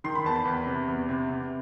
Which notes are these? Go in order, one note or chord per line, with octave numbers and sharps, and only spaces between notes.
D#3 C6
B5
E2 A5
B5
E2
C3
E2
C3
C3